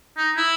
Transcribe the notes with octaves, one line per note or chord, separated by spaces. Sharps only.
D#4
E4